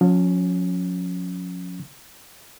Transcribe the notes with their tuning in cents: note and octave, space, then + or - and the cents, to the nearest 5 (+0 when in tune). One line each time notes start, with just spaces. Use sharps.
F3 +45 C#4 +0